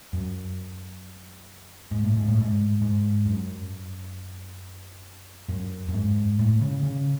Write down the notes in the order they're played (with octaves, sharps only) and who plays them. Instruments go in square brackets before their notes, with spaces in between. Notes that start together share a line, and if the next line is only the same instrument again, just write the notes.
[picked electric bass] F#2
G#2
A2
G#2
A2
G#2
G#2
F#2
F#2
F#2
G#2
A2
C#3
C#3